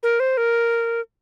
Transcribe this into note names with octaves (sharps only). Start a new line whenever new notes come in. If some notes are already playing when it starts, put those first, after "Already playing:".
A#4
C5
A#4